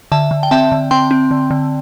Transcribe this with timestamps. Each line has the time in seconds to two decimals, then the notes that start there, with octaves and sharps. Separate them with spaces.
0.12 D3 E5 A5
0.31 D3
0.43 G5
0.51 C4 E5 A5
0.72 D3
0.91 C4 G5 C6
1.11 C4
1.31 D3
1.51 D3